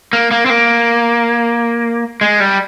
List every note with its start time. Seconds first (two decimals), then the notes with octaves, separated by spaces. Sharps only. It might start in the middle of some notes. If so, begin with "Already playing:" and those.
0.13 A#3
0.31 A#3
0.46 C4
0.50 A#3
2.21 G#3
2.40 G3